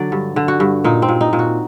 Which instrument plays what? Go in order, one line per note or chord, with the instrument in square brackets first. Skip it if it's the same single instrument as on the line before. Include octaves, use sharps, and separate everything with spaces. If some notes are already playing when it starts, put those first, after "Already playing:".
Already playing: [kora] D3 F#3 D5
G2
D3
F#4
G2
A#2 D#4
C4
A#2
D#4
A#2
F#4